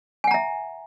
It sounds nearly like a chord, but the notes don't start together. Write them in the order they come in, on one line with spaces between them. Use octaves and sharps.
G#5 F#5 A#5 E5